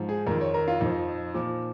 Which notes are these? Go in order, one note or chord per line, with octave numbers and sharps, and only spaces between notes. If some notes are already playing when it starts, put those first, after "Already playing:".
Already playing: G#2 F3
G#4
F2 D#3 A#4
C#5
A#4
F4
F2 F3 D#4
A#2 F3